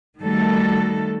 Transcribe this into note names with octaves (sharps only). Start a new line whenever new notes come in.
D#3 G3 A3 F#4 A4